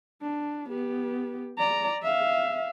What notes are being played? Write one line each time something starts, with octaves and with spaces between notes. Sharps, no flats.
D4
B3 G4
D5 A#5
E5 F5